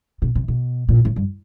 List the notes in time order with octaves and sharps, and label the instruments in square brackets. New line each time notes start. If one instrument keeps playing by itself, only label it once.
[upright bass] B2
C3
B2
A#2
A2
G2